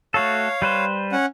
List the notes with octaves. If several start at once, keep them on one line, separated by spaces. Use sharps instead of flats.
A3 F#4 A4 C#5 F5
G3 B4 C5
C#4 F#5